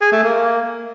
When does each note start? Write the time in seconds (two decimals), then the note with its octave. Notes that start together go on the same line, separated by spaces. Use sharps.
0.01 G#4
0.12 A3
0.23 A#3